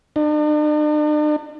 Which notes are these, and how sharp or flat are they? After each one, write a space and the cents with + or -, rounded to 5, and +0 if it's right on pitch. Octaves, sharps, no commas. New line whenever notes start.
D4 +45